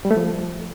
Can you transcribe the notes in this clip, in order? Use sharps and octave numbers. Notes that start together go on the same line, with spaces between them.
G3
A3
F3